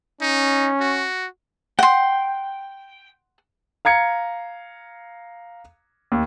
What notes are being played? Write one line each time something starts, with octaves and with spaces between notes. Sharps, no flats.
C#4 D#4
F#4
F#5 G5 C6
F5 A#5 G#6 C#7
D#2